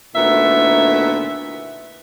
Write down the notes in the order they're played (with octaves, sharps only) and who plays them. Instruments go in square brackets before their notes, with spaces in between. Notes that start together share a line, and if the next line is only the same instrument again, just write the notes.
[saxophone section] D2 A#2 D#3 B3 E4 E5